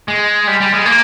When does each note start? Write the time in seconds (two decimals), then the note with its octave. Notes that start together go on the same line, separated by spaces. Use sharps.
0.08 G#3
0.47 G3
0.60 G3
0.73 G#3
0.86 A#3